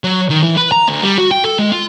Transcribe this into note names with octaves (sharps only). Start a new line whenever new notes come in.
F#3
D#3
E3
B4
A#5
D2
G3
F#4
G5
A4
G#3
F4